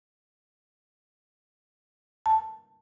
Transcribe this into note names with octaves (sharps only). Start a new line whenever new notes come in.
A5